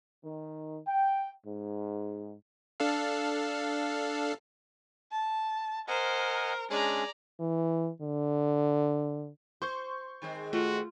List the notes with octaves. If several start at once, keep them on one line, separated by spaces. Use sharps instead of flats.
D#3
G5
G#2
D4 A4 F5
A5
A#4 C5 D#5 F#5 G#5
G#3 C#4 D4 G#4 D5 A#5
E3
D3
C5 C6 C#6 G6
D#3 G#3 C4
A3 F4 F#4